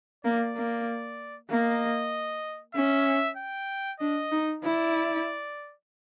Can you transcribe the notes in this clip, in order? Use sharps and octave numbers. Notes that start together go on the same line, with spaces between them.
A#3 D5
A#3
A#3 D#5
C#4 E5
G5
D4 D#5
D#4
E4 D5